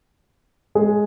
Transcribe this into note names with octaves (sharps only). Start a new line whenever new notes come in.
G#3 G#4